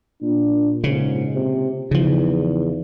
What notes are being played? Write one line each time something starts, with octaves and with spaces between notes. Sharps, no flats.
A#2 D4
G#2 C#3
C3
E2 C#3 F3 D#4